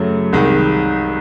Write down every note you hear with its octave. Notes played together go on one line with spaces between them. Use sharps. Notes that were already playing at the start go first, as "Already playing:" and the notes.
Already playing: F#2 C#3 F#3 A3
C2 C3 D#3 G#3